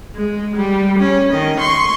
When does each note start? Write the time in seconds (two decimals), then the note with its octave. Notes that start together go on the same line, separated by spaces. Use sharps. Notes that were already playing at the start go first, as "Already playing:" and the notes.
0.15 G#3
0.56 G3
0.99 C#4
1.30 D#3 D#5
1.60 C6 C#6